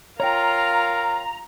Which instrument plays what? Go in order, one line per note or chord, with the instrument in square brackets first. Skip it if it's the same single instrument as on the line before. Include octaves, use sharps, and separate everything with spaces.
[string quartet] F4 F5 [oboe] A#4 [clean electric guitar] C#5 G5 [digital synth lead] A#5